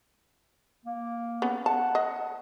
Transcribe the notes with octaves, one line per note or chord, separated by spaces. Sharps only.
A#3
B3 C#4
F#5 A5
D#5